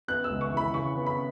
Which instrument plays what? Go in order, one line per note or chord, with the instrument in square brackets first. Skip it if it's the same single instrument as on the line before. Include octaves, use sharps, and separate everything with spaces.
[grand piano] B3 [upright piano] F#6
[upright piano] E6
[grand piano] C#2
[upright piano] C#6
[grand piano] E3 [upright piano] B5
[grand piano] C#3 [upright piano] C#6
[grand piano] B3
[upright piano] B5